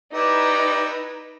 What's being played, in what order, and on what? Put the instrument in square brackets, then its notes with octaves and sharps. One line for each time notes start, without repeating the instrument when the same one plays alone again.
[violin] D#4 B4 [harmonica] E4 G4 D5